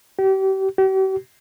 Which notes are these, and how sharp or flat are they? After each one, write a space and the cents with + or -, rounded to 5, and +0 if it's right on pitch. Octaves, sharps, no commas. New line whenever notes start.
G4 -35
G4 -45